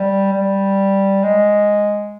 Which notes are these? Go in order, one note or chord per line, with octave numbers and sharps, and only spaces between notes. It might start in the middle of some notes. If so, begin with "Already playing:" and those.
Already playing: G3
G3
G#3